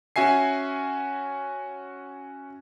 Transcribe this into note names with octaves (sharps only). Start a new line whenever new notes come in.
C#4 F#4 E5 G#5 C7